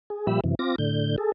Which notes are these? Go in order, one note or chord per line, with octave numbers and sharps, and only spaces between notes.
G#4
A#2 F3 G3 G4 E5 B5
F#2 C3 E3
C4 F4 D6 A#6
A2 D3 G6
G#4 A4